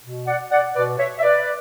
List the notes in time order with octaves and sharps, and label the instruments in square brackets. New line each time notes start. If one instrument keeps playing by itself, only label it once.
[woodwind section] B2
D5 F#5
D5 F#5
B2 B4 D5
C#5 E5
E5
B4 D5